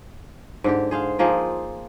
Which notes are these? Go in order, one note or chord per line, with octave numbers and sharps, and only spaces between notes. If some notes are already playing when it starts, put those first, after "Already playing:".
G#2 D3 G4
G#4 C5 F5
F3 A#3 D#4 G#4